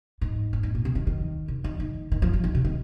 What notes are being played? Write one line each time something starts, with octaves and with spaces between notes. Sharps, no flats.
G#2
F2
G#2
A#2
C3
D#3
D#3
C3
D#3
D#3
D#3
F3
F3
D#3
C3
D#3